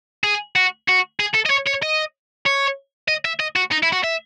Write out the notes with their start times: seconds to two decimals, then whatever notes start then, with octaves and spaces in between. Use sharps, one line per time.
0.24 G#4
0.56 F#4
0.88 F#4
1.20 G#4
1.34 A4
1.46 D#5
1.50 C#5
1.67 C#5
1.83 D#5
2.46 C#5
3.08 D#5
3.25 E5
3.40 D#5
3.56 F#4
3.71 D#4
3.83 E4
3.92 F#4
4.04 E5